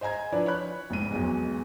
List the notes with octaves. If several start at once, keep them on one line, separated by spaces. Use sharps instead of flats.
C5 D#5 G#5 A#5 G#6
F3 D4 E4 B4 D5
C#5 B5 F#6
F1 G#2 D#7
B1 E2 G#3